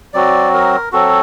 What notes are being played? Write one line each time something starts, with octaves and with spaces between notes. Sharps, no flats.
F#3 C4 F#4 D5
A#4
F#3 C4 F#4 A4